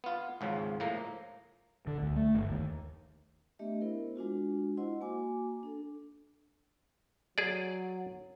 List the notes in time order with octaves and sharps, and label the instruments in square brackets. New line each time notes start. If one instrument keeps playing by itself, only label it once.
[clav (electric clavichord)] B3 F4
G#1 C#2 C#3 F3
A2 F3 A#3 A#5
[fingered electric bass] D3
D2
A3
G1
D#2
[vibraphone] A3 B3 D4 G4 D#5 E5
B3 E4 A#4 C5
G#3 D4 F4 F#4
E4 F4 C5 D#5 F#5 C6
A#3 F#4 G#5 D6
D4 A4
[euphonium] F#3 [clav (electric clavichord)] G#4 D5